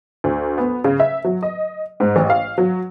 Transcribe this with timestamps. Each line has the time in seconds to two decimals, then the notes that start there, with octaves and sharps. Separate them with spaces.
0.24 D2
0.58 B3
0.84 C#3
1.00 E5
1.24 F#3
1.43 D#5
2.00 G#2
2.16 A1
2.30 F5
2.58 F#3